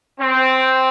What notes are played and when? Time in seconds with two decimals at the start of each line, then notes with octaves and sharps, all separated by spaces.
0.20 C4